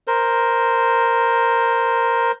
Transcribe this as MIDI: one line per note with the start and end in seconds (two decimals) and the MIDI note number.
0.07 2.32 70
0.07 2.32 72